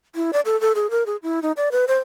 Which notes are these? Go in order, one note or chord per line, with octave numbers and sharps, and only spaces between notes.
E4
D5
A4
A4
G#4
A#4
G#4
E4
D#4
D5
B4
C5